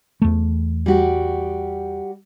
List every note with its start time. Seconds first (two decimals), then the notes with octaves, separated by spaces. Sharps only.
0.22 E2 A3
0.86 G3 F#4 G4